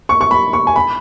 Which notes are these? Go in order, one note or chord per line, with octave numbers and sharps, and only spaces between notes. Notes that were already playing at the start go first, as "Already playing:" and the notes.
C#6
C#6
B5
C#6
G#5
B5